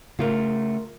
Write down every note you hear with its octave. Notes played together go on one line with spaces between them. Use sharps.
C#3 A3 F4 A#4